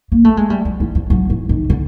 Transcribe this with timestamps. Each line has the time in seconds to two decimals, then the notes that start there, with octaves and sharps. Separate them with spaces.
0.12 A#3
0.25 A3
0.37 G#3
0.50 G3
0.65 F#3
0.80 E3
0.95 F3
1.10 F#3
1.30 E3
1.49 D#3
1.70 D3